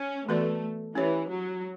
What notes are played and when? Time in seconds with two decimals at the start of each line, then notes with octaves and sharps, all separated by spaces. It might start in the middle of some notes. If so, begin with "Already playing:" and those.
Already playing: C#4
0.27 E3 A3 B3 F#4 B4 D5
0.95 E3 C#4 E4 G4 C#5
1.29 F#3